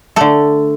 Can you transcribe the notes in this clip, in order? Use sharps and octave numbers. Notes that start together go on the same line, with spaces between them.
D3 A3 A4